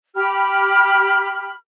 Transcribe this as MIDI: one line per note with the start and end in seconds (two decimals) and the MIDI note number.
0.15 1.52 67
0.15 1.52 83
0.15 1.52 89